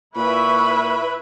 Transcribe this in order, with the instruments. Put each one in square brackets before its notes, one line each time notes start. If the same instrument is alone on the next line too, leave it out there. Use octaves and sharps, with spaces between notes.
[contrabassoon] A#2 [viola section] E4 B4 E5 [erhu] B5 [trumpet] C#6